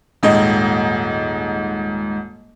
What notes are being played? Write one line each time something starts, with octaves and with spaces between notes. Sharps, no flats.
D#1 G#2 D#5